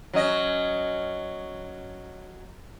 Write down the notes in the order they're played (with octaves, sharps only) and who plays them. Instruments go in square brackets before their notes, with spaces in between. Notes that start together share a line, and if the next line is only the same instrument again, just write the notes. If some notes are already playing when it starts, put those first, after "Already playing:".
[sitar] F#3 C#4 D#5